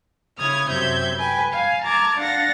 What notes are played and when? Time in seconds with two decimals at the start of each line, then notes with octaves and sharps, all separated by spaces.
0.39 C#3 E4 D#6 F6 G#6
0.69 F#2 C3 C4 E5 G6 G#6
1.16 B4 G5 G#5
1.51 F5 G#5
1.84 A5 A#5 D6 F6 G#6
2.18 D4 F5 F#5 A6 A#6